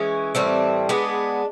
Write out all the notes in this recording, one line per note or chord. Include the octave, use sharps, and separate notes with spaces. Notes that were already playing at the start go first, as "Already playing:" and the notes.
Already playing: E3 G#3 C#4
A2 E3 G3 C4
G#3 B3 D4